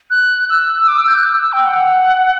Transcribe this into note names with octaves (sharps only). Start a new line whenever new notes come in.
F#6
E6
E6
D6
E6
G6
F#6
E6
E6
G5
F#5